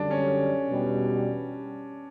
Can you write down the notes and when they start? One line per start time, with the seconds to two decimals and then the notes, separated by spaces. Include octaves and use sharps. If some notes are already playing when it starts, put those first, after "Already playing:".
Already playing: F#2 D3 G3 D4
0.10 C#4
0.69 E2 B2 G3